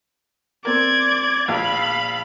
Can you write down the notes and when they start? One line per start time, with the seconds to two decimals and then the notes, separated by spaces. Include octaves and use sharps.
0.65 C4 A#4 D5 G#6
1.48 A#1 F5 B5